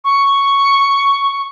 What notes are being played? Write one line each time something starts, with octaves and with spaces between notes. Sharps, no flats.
C#6